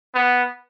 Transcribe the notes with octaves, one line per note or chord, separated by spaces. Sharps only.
B3